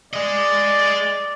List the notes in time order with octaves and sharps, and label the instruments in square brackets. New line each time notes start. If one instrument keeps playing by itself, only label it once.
[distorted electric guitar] G#4 D#5 [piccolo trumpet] D5